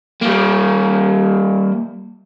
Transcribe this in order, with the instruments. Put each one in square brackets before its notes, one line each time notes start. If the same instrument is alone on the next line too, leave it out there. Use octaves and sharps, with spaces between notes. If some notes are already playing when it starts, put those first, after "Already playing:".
[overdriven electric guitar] G3 A#3